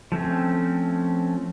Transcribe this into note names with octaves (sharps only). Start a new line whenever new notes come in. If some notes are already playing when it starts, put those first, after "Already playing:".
F3 A3 C4 C#4